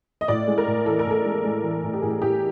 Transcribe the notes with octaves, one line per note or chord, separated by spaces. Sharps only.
D#5
A2 D5
G#3
A#4
A2
E3 A4
A#4
A2 A4
G#3
G#3
E3
A2
G4
A2 G#4
A2 G4